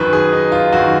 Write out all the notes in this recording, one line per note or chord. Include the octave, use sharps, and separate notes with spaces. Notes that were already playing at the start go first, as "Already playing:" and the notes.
Already playing: F#2 D#3 B4
G#4
D#4
F4
F#2 D#3 F#4